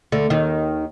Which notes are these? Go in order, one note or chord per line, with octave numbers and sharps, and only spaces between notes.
D2 D3
D#2 D#3